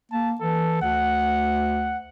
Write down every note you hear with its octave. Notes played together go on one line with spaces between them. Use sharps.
A#3 A5
E3 A4
D2 F#5